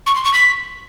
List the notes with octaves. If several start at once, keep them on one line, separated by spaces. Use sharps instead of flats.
C#6
C6
C#6
B6